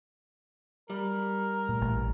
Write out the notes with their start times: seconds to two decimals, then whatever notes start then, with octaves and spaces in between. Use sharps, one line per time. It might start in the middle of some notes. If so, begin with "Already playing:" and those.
0.90 G3 A#4
1.69 A#2 A3
1.81 A1